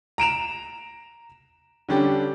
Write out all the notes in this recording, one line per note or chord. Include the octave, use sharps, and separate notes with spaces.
A#5 D7 E7 F7
D3 G3 C#4 D4 G4